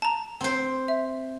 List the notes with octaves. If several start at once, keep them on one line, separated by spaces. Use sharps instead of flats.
A5 A#5
C4 C5
E5